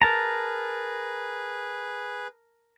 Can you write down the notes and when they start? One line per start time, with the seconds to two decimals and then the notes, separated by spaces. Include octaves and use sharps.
0.02 G#4 A#4 B4 A5 A#5